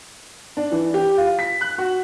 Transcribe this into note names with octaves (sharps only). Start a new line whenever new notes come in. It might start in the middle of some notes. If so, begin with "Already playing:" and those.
D4
E3
G4
F4
B6
F#6
F#4